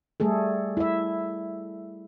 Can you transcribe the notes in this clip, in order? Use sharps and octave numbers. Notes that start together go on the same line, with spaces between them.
G3 A3 G#4 A4
E4 E5